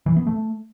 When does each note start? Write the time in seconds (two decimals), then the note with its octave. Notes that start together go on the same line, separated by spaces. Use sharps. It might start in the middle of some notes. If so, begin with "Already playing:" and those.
0.06 E3
0.16 B3
0.27 A3